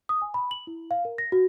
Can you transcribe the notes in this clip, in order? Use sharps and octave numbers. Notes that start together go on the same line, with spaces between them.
D#6
G#5
B5
F#7
E4
F5
A#4
A#6
F#4